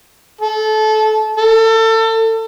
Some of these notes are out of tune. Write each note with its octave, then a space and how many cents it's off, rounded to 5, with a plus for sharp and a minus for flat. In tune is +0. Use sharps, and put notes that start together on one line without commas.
A4 -25
A4 +30